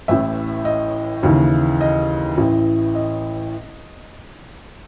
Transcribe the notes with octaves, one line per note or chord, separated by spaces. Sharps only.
A1 A2 E3 E5
D#5
D#2 C#3 E3
D#5
A1 A2 E3
D#5